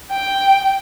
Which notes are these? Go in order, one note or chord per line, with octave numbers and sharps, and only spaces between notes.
G5